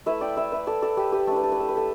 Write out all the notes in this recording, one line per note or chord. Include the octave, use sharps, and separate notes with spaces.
A3 E4 B4 E5
D5 G5
B4 E5
B4 E5
A4 D5
A4 D5
G4 B4
G4 B4
A3 D4 A4
B4
A4
B4
A4
B4
A4